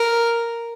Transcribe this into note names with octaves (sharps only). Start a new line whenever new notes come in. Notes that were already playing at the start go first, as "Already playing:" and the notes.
Already playing: A#4